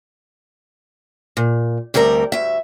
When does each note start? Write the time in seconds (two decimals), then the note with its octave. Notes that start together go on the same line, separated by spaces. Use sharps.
1.37 A#2
1.94 D2 C3 G3 A#4 A#5
2.32 D2 E5